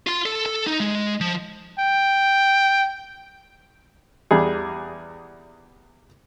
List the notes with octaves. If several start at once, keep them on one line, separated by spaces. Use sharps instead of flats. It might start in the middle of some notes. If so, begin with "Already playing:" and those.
F4 C6
A4
A4
D#4
G#3
F3
G5
E2 G3 D4 G#4